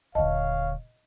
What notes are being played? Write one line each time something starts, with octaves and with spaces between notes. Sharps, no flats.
D#1 D3 C#5 D#5 F5 A5